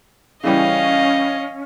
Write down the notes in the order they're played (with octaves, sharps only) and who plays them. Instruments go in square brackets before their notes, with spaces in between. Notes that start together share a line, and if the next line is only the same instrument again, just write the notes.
[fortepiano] C#3 E3 G3 [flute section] C#4 [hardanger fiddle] D#5 F5